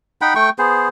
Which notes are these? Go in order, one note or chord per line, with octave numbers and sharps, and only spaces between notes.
D#4 F#5 G5 B5
A3 G5 C#6
B3 G#4 C5